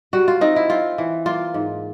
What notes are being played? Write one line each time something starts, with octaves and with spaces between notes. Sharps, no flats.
G3 F#4
F4
C4 D#4
E4
C4 F4
E3
A#3 F4
G#2